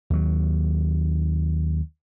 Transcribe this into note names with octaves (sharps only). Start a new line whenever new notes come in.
D#2 F#3